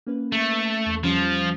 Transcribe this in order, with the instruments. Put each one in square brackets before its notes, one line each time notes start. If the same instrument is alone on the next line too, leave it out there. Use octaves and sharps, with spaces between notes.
[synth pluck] A#3 C#4 B4
[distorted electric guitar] A3
[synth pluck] E2
[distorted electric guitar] F3 [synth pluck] G3 C#4 B5